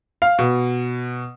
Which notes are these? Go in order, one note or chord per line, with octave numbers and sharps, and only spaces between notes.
F5
B2